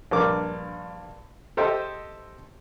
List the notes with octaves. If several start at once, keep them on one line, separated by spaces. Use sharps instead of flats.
A#1 G2 A#4 D6
G4 A4 C5 D#5 E5 G5